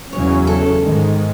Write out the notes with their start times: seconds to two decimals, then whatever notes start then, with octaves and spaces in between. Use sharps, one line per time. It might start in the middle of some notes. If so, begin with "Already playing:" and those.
0.12 E2 C#3 F#3 C#4 C#5
0.47 A4
0.83 G#2 D#3 G#3